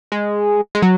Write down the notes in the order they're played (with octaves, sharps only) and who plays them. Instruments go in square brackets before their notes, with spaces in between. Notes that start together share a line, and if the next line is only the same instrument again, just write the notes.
[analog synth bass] G#3
G#3
F#3